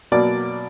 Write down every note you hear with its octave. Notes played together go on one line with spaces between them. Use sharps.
B2 F#3 A#3 D5